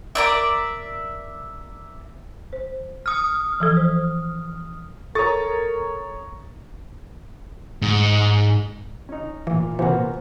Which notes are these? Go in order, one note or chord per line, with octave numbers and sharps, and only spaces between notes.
A#4 D5 E5
C5
D#6 F6
E3 F3 A4
C5
A4 A#4 C#5 A#5 C#6 D#6 A6
G#2
C#4 D#4
A#2 E3
C3 E3 A#3 B3 F#4 C5